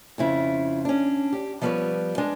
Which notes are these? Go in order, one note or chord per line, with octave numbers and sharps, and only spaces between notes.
F2 C#3 E4 F4
C#4 D4
G4
F3 G3 B3 A#4 B4 C#5
G#3 D4